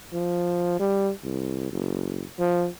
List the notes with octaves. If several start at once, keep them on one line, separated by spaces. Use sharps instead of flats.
F3
G3
C2
F#1
F3